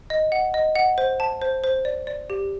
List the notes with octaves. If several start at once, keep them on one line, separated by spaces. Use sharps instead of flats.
D#5
F#5
D#5
F#5
C5
A5
C5
C5
D5
D5
G4